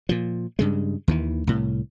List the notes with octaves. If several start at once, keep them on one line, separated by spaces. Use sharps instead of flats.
A#2 F3
G2 C#3 G#3
D#2 D#3 E3
C2 A2